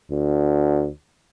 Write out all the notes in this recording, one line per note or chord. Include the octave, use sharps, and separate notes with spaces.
D2